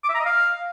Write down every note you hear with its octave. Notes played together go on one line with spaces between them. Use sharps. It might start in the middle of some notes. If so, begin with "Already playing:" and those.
D6
E5
A#5
D#5
F5